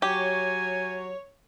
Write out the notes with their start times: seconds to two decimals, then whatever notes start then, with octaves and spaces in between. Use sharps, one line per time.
0.02 F#3 G4 C#5 G#5